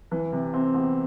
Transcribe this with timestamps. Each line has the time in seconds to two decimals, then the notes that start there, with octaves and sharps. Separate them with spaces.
0.11 E3
0.32 C3
0.54 C4
0.74 E2